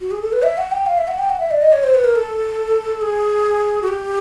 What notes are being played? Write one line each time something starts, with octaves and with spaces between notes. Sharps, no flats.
F#4
G#4
A4
B4
E5
F#5
G5
F5
E5
F#5
G5
F#5
E5
D5
D#5
C#5
C5
B4
A#4
A4
G#4
F#4
G4